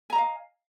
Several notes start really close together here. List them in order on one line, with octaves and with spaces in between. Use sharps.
G#5 A#5 D#5 F5